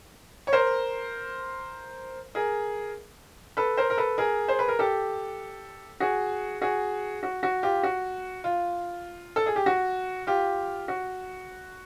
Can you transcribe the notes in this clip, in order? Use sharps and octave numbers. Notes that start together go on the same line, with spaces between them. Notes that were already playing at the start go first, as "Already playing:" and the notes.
C#5
A#4 C5
G#4 A#4
A4 B4
A#4 C5
A#4
A4 B4
G#4 A#4
C5
B4
A#4
G4 A4
F#4 G#4
F#4 G#4
F#4
F#4
F4 G4
F#4
F4
A4
G#4
G4
F#4
F4 G4
F#4